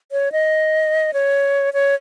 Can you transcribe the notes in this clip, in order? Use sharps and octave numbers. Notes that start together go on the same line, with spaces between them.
C#5
D#5
C#5
C#5